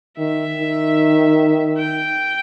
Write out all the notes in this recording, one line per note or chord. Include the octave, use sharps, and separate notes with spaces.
D#3 E5
D#3
G5